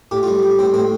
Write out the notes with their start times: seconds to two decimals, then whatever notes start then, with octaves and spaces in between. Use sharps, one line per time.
0.11 A2 G4
0.23 F4
0.27 G3
0.42 G3
0.59 A2 C4
0.74 A2 C4